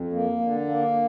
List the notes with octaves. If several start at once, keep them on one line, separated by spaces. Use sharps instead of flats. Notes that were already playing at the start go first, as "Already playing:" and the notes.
Already playing: F2
A#3
D3
A#3